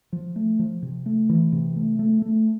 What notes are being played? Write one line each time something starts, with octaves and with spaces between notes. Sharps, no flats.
F3
A3
F3
C3
A3
E3
C3
A3
A3
A3